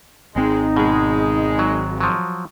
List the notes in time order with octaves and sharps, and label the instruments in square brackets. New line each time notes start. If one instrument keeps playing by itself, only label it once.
[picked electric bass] G#1 C4 [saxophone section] G#3 [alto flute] D#4
[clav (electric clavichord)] B2 [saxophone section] G#3
[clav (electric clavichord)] F#3
F3 F#3